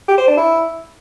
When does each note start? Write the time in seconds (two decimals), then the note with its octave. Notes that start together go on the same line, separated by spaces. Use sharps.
0.08 G4
0.18 C5
0.27 D4
0.37 E4